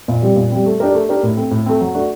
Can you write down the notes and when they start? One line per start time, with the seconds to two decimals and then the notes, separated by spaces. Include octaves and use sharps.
0.08 A#2
0.23 G3 C4
0.36 A#2
0.51 G3 C4
0.66 A3
0.80 D4 G4 A#4
0.95 A3
1.09 D4 G4 A#4
1.23 A2
1.37 A3 C4
1.51 A2
1.66 A3 C4
1.81 F#3
1.94 A3 D4 F#4